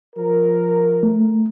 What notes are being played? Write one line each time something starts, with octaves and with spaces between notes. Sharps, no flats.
F3 A#4
A3